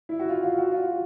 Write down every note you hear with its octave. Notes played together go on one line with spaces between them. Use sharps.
E4
F#4
F4
F4
F#4
F4
F#4